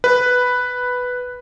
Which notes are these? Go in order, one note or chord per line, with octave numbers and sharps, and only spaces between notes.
B4